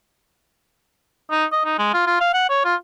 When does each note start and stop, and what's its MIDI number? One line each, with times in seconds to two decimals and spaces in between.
1.31 1.45 63
1.52 1.61 75
1.65 1.76 63
1.79 1.92 56
1.94 2.05 65
2.07 2.16 65
2.21 2.29 77
2.34 2.48 78
2.50 2.64 73
2.65 2.75 65